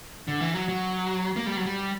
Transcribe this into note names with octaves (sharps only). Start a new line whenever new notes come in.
D3
E3
F#3
F#3
A#3
G3
F#3
G3